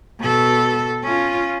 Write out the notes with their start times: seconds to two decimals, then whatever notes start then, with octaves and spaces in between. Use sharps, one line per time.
0.19 B2 A4
1.03 C#4 F4